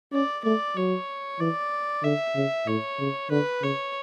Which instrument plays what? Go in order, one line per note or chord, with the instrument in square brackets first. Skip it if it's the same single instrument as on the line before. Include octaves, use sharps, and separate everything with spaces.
[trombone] C#4 [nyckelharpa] D5
[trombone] A3 [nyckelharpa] D5
[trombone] F#3 [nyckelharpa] C#5
[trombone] E3 [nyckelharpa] D5
[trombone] D3 [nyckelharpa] E5
[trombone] C#3
[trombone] A2 [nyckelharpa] C#5
[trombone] C#3
[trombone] D3 [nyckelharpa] B4
[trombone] C#3 [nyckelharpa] C#5